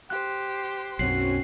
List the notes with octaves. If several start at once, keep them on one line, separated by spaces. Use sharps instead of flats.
G4 C5 F#6
C6
B1 F#2 C4 C#4 F#4 C7 F#7